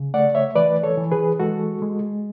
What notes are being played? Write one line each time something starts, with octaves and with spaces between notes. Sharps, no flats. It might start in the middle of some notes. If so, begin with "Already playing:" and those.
Already playing: C#3
A3 D5 F#5
C#5 E5
E3 B4 D5
A4 C#5
E3
G#4 B4
G#3 F#4 A4
G#3